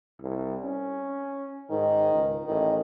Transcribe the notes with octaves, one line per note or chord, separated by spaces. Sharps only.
C2
C#4
G#2 D#3
C#2
A1 D#3